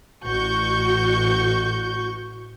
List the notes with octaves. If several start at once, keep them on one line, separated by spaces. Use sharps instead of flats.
A1 F#4 C#6 G6